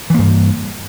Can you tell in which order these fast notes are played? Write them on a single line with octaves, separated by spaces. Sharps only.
E3 A#3 G2